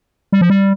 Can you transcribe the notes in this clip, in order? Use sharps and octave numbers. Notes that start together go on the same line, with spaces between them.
G3
F3
G3